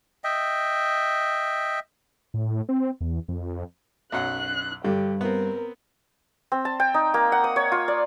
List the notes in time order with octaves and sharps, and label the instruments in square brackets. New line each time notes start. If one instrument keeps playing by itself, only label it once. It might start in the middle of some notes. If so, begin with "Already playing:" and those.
[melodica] D#5 E5 G5
[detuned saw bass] A2
C4
E2
F2
[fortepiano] B1 F#2 F#5 [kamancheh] F#6
[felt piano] G2 [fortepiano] D3 [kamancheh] G4
[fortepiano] B3 C4 [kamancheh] A#4
[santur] C4
A5
G5
D#4
A#3
F#5
D#6
C#5
F4
D5